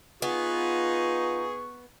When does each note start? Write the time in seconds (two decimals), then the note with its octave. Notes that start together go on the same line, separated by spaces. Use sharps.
0.22 B3 D#4 F4 G#4 C#6